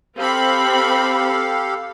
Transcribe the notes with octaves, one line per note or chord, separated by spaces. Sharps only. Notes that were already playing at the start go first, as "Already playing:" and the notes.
C4 G4 A4 F5 B5